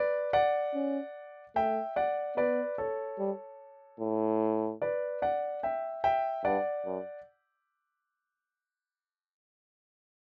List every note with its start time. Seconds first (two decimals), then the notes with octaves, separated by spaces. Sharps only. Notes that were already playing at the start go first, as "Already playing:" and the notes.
Already playing: B4 D5
0.33 D5 F#5
0.74 C#4
1.56 A3 E5 G5
1.96 D5 F#5
2.37 B3 B4 D5
2.78 A4 C#5
3.19 G3
4.00 A2
4.82 B4 D5
5.22 D5 F#5
5.63 E5 G5
6.04 E5 G5
6.45 G2 D5 F#5
6.86 F#2